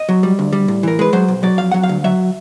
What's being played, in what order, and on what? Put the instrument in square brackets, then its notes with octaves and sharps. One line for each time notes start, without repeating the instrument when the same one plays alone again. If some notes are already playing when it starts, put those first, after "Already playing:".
Already playing: [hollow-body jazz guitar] D#5
F#3
G3
D2
G3
A2
E3 A#4
G#3 B4
F#3 C5
B1
F#3 D5
F2 F5
F#3 F#5
F5
D2
F#3 E5